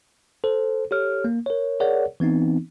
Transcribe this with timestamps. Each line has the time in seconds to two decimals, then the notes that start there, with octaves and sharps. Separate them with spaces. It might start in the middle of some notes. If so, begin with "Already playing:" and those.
0.44 A4 C5
0.91 G4 A4 C#5 F6
1.25 A#3
1.46 A#4 C#5
1.80 G#4 A#4 C#5 D5 F#5
2.20 E3 B3 C4 D#4